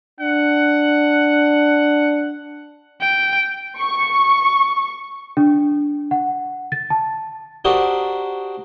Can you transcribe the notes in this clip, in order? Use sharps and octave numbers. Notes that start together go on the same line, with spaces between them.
D4 F#5
G5
C#6
D4
F#5
A6
A5
D4 F#4 G4 A#4 C5 D#5